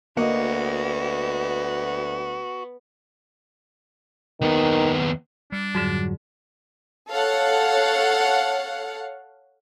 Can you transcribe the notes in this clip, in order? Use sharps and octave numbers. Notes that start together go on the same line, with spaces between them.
D2 A#3 B3 F#4 D#5
D#2 D#3 B3
G3 D4
F2 G#2 D3 F#3
A4 C#5 F5 F#5